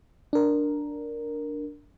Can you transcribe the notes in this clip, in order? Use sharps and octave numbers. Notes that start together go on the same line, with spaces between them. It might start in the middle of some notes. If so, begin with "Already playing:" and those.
D4 A#4